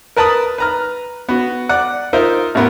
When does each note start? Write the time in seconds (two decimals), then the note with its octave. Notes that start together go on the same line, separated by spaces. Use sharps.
0.17 A#4 B4 A5 B5 D#6
0.58 B4 A#5 F6
1.29 B3 F#4
1.69 D5 F#5
2.13 D#4 F4 A#4 C5 E5 F5
2.55 A1 B3 A#4